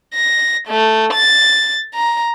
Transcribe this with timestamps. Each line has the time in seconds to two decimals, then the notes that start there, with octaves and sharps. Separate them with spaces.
0.14 A#6
0.68 A3
1.13 A6
1.94 A#5